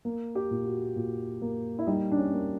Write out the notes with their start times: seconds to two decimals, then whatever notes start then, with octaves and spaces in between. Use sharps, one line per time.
0.05 A#3
0.35 G4
0.51 A#2
0.65 F#4
0.96 A#2
1.42 A#3
1.79 E4
1.87 G3 D#4
2.12 D4
2.18 C#4
2.33 A#3